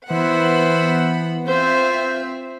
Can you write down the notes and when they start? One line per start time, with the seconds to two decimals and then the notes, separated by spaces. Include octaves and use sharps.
0.10 E3 B3 E4 C5 F#5 B5
1.47 C4 F4 C5 E5 G6